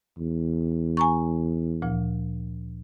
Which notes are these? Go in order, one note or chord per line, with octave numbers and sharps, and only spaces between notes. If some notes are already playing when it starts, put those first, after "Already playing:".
E2
G#5 A#5 C#6
D2 A#2 F3